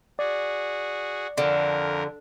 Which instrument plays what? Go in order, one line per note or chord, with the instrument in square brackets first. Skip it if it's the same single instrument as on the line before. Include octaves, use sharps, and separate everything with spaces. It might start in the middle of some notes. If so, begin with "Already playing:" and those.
[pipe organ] F#4 G#4 [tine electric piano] D5
[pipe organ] F2 A#4 [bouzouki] D3